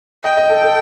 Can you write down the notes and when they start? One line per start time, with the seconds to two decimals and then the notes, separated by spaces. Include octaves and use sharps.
0.24 D#5 G5
0.37 D#5
0.50 A4
0.63 A4